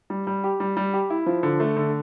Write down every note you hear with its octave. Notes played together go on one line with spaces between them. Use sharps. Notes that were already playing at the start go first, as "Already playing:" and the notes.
G3
G3
G4
G3
G3
G4
E4
F3
D3
A3
D3